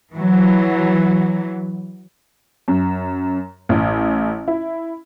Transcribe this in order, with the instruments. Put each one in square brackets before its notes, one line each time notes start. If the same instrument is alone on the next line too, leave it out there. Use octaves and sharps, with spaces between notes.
[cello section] E3 F#3
[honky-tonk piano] F#2
A1
E4